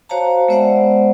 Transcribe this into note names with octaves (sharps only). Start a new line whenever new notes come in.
F#4 C5 C#5 F5 A5 A#5
G#3 B3 C5 D5 E5 F#5